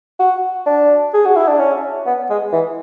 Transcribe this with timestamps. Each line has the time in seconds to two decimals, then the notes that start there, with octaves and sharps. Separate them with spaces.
0.19 F#4
0.66 D4
1.14 G#4
1.25 F#4
1.36 E4
1.48 D4
1.59 C#4
2.06 B3
2.30 G#3
2.53 E3